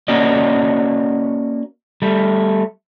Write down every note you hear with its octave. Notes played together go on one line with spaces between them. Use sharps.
A#3 C#4 F#4 D5 D#5
G3 A3